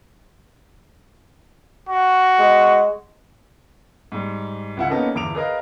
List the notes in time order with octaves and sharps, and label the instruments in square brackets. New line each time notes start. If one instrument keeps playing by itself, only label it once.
[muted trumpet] F#4
[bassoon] G#3
[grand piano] G#2 G3
C#2 E4 F#5
A#3 B3 C#4 D#4 A4 A#4
G1 E2 D6 D7 F7
G#4 A#4 B4 D#5 F5 A#5